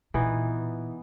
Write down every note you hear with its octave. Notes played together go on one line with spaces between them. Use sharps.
A#2 E3 B3 D#4